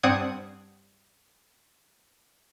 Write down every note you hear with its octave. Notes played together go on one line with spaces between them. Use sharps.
G2 C4 D5 F#5 D#6 G#6